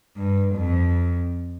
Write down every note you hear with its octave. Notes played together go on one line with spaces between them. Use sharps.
G2
F2